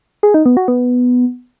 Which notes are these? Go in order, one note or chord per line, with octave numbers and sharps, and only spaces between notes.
G#4
D#4
B3
F#4
B3